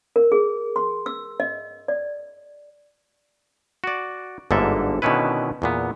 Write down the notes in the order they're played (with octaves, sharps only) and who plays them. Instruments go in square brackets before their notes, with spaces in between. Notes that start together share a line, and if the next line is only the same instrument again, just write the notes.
[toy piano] A#4
G#4
C6
E6
D#5
D5
[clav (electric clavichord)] F#4 D5
G1 G#2 D3 A#3 A4 E5
B2 D3 D#3 C#4 E4 B4
E2 A#2 B3